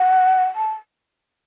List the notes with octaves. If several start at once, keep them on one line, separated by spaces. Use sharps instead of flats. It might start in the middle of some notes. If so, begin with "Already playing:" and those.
Already playing: F#5
A5